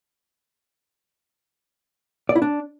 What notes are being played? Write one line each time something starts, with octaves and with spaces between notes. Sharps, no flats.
D5
E4
D4